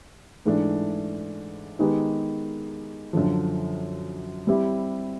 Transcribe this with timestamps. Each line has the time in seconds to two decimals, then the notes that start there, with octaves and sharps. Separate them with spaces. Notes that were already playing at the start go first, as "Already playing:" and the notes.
0.45 G#2 E3 A3 D4
1.79 D#3 G#3 B3 D#4 G4
3.13 F#2 D3 F3
4.47 G3 C4 E4 G4